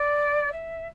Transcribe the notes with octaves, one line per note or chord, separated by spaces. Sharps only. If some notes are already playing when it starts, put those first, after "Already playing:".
Already playing: D5
E5